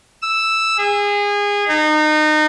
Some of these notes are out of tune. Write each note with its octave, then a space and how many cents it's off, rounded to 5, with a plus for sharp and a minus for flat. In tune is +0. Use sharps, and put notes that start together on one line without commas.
E6 +0
G#4 -25
D#4 -30